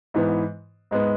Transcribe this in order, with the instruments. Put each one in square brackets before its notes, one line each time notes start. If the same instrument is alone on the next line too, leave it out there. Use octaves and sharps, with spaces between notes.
[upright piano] G#2 E3 B3
G#2 G#3 B3